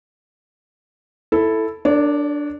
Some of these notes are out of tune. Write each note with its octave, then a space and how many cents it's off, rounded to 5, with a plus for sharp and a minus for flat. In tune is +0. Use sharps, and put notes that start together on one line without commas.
E4 +0 A4 +0
D4 +0 A#4 -30 C#5 +45